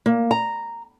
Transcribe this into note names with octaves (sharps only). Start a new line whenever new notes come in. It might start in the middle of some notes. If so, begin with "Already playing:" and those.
A#3
A#5